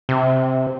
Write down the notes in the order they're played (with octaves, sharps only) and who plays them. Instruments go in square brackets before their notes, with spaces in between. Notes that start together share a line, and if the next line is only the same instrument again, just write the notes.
[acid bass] C3